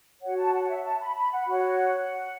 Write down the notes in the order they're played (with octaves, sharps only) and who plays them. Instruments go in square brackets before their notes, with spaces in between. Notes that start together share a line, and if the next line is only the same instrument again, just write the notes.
[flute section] F#4 C#5 F#5
A5
F#5
E5
A5
B5
B5
F#5
F#4 C#5 F#5